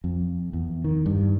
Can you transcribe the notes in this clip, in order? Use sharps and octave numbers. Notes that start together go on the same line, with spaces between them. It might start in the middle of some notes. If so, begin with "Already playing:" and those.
F2
E2
D#3
G2